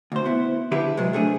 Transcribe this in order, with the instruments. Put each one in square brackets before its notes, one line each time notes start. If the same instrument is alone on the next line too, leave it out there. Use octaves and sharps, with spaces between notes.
[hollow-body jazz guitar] D2 C5
B3 E4
D3 E4 G4 G#4 B4
C3 F#3 G#3
C3 A3 D4 G#4